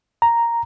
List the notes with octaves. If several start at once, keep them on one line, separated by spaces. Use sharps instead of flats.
A#5